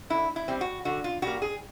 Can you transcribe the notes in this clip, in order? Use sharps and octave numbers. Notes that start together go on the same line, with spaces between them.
D3 E4
E4
G3 C4
F#4
D3 F#4
F4
G3 A#3 F#4
G#4